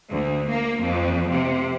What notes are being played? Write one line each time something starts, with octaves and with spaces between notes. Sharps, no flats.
D2
A#3
F2
C3